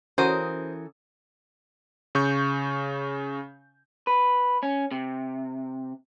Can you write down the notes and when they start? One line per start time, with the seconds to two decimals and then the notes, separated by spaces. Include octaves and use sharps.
0.18 E3 C#4 F#4 A4 A#4 C5 D#6
2.15 C#3 C#6 G6
4.07 B4
4.63 C#4
4.91 C3